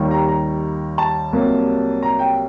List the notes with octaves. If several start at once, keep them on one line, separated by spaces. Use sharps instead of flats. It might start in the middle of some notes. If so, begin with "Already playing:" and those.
Already playing: D#2 D#3 G3
A#5
A#5
A5
C2 C3 F#3 A#3
A#5
G5